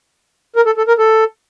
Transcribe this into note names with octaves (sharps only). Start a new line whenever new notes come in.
A#4
A4
A4
A#4
A4